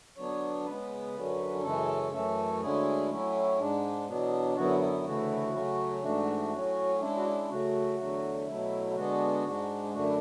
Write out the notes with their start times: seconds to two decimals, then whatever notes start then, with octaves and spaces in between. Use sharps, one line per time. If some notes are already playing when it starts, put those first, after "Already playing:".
0.17 D3 F#3 B3 D4 C#5
0.66 C#3 G#3 B3 B4
1.15 F#2 D3 F#3 C#4
1.63 F#2 C#3 E3 G#3 C#4 A4
2.12 F#2 E3 A3 C#4 A4
2.61 D2 D3 G#3 C#4 E4 G#4
3.09 A2 F#3 C#4 E4
3.58 G#2 G#3 D4
4.07 E2 B2 F#3 B3 D4
4.56 F#2 D3 F#3 B3 E4 F#4
4.81 E4
5.05 D2 C#3 E3 A3 E4 F#4
5.54 C#3 F#3 A3 C#4
6.03 G#2 E3 A3 D4 F#4
6.52 A2 F#3 C#4
7.00 C#3 G#3 D4 E4
7.16 F#4
7.25 E4
7.49 C#3 F#3 A3 F#4
7.98 E2 D3 F#3 A3
8.47 B2 F#3 A3 E4
8.96 D3 G#3 B3 D4 F#4
9.44 G#2 G#3 D4
9.94 F#2 D3 A3 D4 F#4
10.03 E4